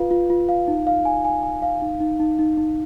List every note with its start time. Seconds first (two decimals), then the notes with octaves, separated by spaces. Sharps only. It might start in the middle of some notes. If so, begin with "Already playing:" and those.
Already playing: F4 B4 F5
0.11 F4
0.30 F4
0.49 F5
0.68 D#4
0.87 F5
1.05 G#5
1.25 G#5
1.43 G#5
1.62 F5
1.82 D#4
2.00 D#4
2.20 D#4
2.39 D#4
2.57 D#4